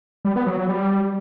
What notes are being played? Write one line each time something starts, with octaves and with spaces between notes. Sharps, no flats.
G3
B3
F#3
F#3
G3